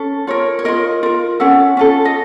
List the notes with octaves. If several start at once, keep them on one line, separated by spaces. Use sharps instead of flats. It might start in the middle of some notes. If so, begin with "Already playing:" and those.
Already playing: C#4 A4
F4 A#4 C#5
C#5
F4 A#4 D#5
F4 A#4
C#4 A4 F#5
C#4 F4 A4
D#5